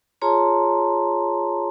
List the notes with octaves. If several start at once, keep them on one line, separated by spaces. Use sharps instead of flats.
F4 G#4 C#5 A5 A#5 C6